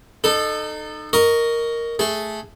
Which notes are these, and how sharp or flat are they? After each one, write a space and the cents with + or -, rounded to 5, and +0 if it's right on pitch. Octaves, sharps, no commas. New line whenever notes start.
D#4 -30 A4 +0
A#4 +0 D#5 +0 C#6 +10
A3 -5 G#4 +0